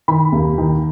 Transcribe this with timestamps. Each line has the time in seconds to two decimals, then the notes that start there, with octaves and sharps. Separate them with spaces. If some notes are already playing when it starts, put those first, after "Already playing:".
0.08 D#3 B5
0.32 D#2
0.58 D#3